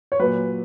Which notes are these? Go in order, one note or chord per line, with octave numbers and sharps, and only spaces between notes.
C#5
A#2 F#3 B4